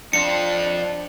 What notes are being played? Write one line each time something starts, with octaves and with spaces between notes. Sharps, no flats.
F2 C4 D4 C#7